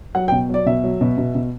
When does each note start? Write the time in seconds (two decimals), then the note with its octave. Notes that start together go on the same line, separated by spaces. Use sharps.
0.15 F#3 F#5
0.28 G5
0.32 B2
0.49 F#3 D5
0.66 B2 E5
0.84 F#3
1.01 B2
1.18 B2
1.35 B2